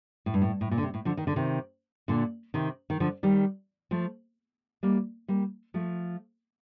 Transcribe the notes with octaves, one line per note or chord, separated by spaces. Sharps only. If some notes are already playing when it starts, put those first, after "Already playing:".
A2
G2
A2
A2
A#2
D3
C3
A2
D3 F3
D#3
D3
C3 D#3
A#2 D3
C3 D#3
D#3
D3 F3
D#3 G3
F3 A3
G3 A#3
G3 A#3
F3 A3